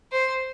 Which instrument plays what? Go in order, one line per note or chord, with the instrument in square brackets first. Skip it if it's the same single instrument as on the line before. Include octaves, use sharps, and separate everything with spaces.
[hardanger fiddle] C5